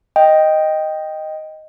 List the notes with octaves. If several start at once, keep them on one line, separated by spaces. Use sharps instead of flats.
D#5 G5